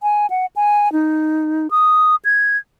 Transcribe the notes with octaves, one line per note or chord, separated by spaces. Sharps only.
G#5
F#5
G#5
D#4
D#6
G#6